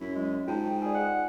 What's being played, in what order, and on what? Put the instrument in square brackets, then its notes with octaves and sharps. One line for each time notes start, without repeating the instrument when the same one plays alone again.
[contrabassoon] F#2 [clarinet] E4
[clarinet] G#3
[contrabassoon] G#2 [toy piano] F4 A5 [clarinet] G5
[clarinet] G#4 [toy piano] D5 G#5
[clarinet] F#5